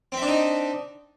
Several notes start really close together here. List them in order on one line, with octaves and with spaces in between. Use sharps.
C4 E5 D4 D#4